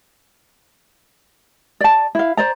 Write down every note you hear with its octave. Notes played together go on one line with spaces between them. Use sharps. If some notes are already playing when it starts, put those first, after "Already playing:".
D5 A5
E4 F5
C5 D5 A#5